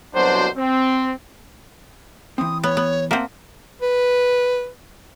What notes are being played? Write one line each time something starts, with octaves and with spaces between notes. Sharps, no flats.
C2 B2 F#3 D4 C5
C4
E3 C4 D#6
B3 C#5
B3
A#3 C4 E5 F#5 A5
B4